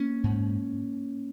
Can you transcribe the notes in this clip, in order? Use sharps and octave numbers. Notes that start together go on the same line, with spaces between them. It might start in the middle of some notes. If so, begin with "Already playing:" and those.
Already playing: A#3 C#4
G#2